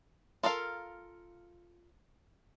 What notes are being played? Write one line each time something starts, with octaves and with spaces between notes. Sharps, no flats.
F4 A4 A#4 F5